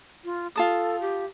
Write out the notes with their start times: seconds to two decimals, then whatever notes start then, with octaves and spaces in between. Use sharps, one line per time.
0.24 F4
0.56 F4 A4 A5 D#6
1.01 G4